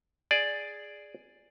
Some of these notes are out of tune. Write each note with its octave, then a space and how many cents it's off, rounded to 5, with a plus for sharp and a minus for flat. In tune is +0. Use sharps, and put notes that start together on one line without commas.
G#4 +0 D5 +0